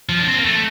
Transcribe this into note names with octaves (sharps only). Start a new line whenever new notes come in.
F3
D4
C4
A#3
A3